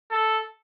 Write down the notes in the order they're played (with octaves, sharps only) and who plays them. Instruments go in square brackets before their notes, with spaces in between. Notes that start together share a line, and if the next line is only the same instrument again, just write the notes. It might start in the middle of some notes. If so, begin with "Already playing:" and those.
[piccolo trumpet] A4